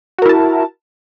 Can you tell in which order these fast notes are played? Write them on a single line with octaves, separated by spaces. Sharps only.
F#4 A#4 E4 A5